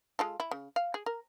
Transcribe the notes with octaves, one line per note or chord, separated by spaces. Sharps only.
G#3 F4 A4
E4
C#3
F5
G#4
A#4